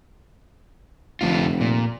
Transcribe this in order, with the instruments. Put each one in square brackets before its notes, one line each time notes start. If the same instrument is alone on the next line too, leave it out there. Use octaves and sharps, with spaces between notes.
[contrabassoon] F1 [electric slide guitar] F2 D3 F4
[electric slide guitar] A#2